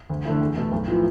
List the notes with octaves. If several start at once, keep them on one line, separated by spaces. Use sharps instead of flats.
D2
D3 A3 E4
E2
B2 A3
B1
A2 F3 B3 F4